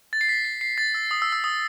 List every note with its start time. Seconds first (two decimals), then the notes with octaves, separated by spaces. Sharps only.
0.13 A6
0.21 C7
0.29 B6
0.45 C7
0.61 C7
0.78 A6
0.94 E6
1.11 D#6
1.22 E6
1.32 E6
1.44 D#6